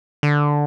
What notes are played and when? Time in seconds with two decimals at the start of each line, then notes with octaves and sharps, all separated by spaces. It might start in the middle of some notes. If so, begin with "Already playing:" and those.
0.23 D3